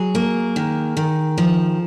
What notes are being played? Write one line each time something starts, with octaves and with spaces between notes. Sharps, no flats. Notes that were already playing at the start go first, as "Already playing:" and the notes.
Already playing: F#3 G#4
A#3
D#3
D#3
F3